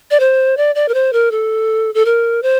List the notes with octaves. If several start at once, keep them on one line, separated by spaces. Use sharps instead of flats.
D5
C5
D5
D5
A#4
C5
A#4
A4
A4
A#4
C5